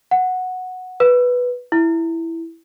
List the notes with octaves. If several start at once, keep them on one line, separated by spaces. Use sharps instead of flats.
F#5
B4
E4